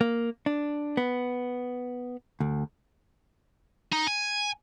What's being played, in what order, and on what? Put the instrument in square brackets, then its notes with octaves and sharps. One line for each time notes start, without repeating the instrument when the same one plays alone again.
[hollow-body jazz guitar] A#3
D4
B3
D2
[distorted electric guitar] D#4
G#5